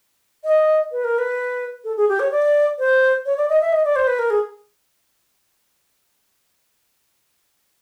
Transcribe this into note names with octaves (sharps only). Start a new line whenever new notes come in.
D#5
B4
A#4
B4
A4
G#4
G4
C#5
D5
C5
C#5
D5
D#5
E5
D#5
D5
C5
B4
A#4
G#4